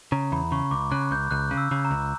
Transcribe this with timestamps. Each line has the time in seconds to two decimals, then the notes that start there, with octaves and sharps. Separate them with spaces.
0.12 C#3 A#5
0.32 E2 B5
0.52 C#3 C#6
0.71 C#2 D6
0.92 C#3 F#6
1.11 C#2 G6
1.31 C#2 F#6
1.51 C#3
1.57 E6
1.71 C#3
1.85 A#5
1.91 C#2